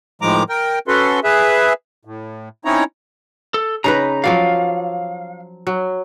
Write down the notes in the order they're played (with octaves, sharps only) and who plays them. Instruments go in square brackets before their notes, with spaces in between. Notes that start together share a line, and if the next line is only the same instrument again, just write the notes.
[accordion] A2 D#3 F3 G#3 A#5 D6
A#4 G5
C#4 F#4 A4 B4 C6
G#4 B4 E5
A2
C4 C#4 D#4 E4 C#5 A#5
[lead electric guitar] A4
[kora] C#3 D#4 B4 [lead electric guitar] A#5
[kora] F3 F#3 D5 [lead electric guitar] F5
[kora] F#3